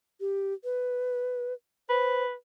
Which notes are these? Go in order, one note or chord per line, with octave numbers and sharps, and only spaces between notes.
G4
B4
B4 C5